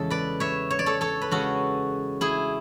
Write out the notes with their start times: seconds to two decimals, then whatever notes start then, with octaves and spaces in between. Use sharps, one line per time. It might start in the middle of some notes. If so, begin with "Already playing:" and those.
Already playing: E2 C#3 G#3 A4
0.10 B4 D5
0.40 C#5 E5
0.70 C#5
0.79 D5
0.86 A4 C#5
1.01 A4 C#5
1.21 B4
1.31 C#3 G#3 C#4 F#4 A4
2.21 E4 G#4